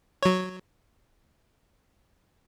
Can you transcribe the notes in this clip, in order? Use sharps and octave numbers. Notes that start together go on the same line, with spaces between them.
F#3 C#5